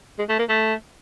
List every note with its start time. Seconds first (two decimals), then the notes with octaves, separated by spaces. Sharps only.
0.19 G#3
0.29 A3
0.39 A#3
0.49 A3